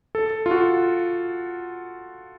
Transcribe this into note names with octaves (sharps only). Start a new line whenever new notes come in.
A4
F4
F#4